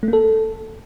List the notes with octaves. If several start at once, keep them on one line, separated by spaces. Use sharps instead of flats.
A3
A#3
A4